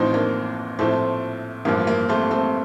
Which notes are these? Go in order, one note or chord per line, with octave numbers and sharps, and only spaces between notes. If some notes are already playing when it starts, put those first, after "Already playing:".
Already playing: A1 A2 F3 C4 D#4
A#3 D4
A#1 A2 F3 A3 C4
A1 G2 F3 A#3
A#3
A3 C4
A3 C4